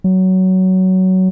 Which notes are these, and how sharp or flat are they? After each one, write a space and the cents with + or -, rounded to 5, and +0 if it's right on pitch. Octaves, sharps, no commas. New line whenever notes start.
F#3 +15